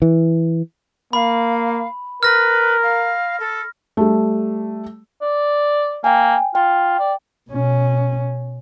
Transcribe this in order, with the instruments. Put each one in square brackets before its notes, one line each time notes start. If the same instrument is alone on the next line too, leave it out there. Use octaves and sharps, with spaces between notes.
[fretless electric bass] E3
[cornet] A#3 [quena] F5 [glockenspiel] B5
[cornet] A#4 [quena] B4 [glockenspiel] F6 A#6
[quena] F5
A4
[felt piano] G3 A3
[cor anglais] D5
[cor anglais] A#3 [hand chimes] G5 G#5
[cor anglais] F4 [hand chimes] G5
[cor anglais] D5
[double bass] B2 C#4